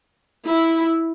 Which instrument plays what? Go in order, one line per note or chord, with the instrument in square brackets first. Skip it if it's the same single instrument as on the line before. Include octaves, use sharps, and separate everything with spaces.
[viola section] E4